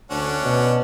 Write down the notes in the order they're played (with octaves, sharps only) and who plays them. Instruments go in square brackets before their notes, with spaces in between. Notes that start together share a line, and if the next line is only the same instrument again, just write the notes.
[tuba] D2 [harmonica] C#4 D4 F#5
[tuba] B2